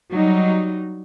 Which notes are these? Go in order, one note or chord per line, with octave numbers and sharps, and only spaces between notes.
F#3 G3 D#4